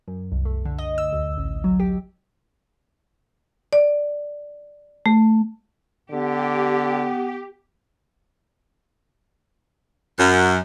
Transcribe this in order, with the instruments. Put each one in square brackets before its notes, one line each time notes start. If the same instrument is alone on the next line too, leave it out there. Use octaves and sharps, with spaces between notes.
[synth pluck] F#2
C2
A3
D3
D#5
E6
D2
A1
F#3
G4
[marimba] D5
A3
[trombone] D3 [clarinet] B3 [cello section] G4
[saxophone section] F#2